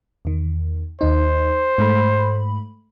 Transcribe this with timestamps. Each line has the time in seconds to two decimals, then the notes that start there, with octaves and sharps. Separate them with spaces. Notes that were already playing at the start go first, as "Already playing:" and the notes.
0.25 E2 D#3
1.01 D#2 D#4 C5
1.78 G#2 A3 B5